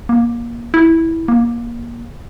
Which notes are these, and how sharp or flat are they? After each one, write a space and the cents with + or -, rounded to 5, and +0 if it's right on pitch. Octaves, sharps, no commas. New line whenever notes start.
A#3 +20
E4 -10
A#3 +20